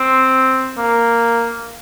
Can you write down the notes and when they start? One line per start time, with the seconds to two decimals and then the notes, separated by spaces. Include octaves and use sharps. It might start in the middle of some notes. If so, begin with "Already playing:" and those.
Already playing: C4
0.77 A#3